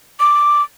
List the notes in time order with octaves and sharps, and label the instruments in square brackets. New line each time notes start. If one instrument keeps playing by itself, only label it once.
[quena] D6